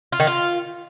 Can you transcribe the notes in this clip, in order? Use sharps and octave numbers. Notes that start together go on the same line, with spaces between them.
F4
D#3
F4